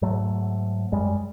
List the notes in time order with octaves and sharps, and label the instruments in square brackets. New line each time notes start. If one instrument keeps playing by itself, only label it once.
[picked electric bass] G#2 F#3 A3
F#2 G3 G#3